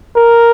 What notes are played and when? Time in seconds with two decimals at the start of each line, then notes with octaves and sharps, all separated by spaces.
0.16 A#4